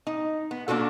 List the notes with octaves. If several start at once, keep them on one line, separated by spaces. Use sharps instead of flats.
D#4
B3
A#3 D4 F4 F#4 A4